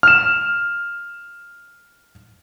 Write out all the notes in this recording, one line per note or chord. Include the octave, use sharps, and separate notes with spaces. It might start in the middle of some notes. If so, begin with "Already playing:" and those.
F6 E7